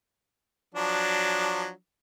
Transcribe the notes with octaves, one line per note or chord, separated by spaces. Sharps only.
F3 F#3 D4